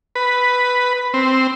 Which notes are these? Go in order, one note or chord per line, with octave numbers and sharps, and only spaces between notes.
B4
C4